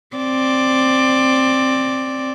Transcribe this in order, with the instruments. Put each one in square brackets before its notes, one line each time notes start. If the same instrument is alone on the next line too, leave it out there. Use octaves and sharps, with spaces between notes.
[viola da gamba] C4 D5